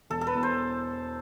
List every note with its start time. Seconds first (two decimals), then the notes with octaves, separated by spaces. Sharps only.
0.10 E1 A4
0.21 A4
0.27 B4
0.35 E2
0.43 C5